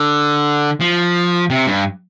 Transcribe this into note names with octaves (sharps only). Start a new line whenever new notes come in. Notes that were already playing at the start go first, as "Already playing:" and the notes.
Already playing: D3
F3
C3
G2